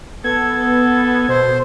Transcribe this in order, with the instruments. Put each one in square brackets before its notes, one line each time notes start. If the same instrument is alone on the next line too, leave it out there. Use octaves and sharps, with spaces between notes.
[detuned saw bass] B3 [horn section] A4 [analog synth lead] G#6
[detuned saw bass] B2 [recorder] C5